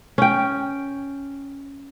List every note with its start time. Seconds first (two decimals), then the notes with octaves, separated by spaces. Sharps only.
0.18 C#4 G5